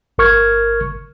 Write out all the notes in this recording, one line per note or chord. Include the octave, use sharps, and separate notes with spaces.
G1 A#4 C#6 F6 G#6